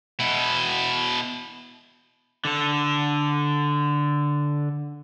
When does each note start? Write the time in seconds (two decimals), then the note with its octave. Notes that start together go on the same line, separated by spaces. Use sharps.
0.20 B2 E4
2.45 D3 A4